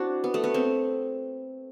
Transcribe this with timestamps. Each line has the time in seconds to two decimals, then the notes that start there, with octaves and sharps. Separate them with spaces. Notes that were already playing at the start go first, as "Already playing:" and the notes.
Already playing: C4 D4 E4 F#4
0.24 B3
0.34 A3
0.44 B3
0.54 C4